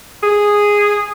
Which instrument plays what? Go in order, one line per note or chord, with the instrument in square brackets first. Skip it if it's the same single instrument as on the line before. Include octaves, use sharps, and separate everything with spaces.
[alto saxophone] G#4